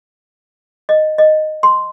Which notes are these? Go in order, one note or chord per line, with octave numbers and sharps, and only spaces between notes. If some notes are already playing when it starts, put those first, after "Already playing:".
D#5
D#5
C6